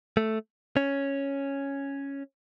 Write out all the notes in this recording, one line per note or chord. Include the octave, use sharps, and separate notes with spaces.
A3
C#4